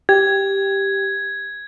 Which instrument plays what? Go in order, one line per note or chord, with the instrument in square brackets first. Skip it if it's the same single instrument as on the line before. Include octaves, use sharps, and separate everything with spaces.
[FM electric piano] G4 [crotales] G#6